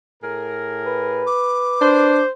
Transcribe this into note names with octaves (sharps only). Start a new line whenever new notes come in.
A2 G#4 A#4
B4
D6
D4 C5